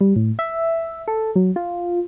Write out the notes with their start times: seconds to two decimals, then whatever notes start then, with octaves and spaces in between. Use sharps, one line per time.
0.01 G3
0.16 A2
0.39 E5
1.08 A4
1.36 F#3
1.56 F4